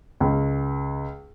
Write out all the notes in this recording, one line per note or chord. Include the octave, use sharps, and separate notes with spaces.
C#2